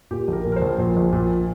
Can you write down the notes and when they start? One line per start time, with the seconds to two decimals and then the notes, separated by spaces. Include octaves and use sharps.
0.11 A#2 G4
0.28 A#1 A#4
0.45 A#2
0.52 A#4
0.56 C5
0.62 A#1
0.78 A#2 C5
0.97 A#1
1.12 A#2